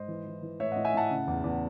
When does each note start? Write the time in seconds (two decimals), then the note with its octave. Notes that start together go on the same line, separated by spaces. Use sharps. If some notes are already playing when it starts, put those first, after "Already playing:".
Already playing: G#2 C5 D#5
0.08 E3
0.26 E3
0.42 E3
0.60 A2 C#5 E5
0.72 A2 D#5 F#5
0.85 E5 G#5
0.94 A2 F#5 A5
1.10 C#3
1.27 E2
1.44 E2